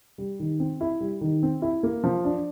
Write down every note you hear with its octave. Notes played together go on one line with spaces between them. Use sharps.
G3
D#3
C4
E4
G3
D#3
C4
E4
A#3
F3
D4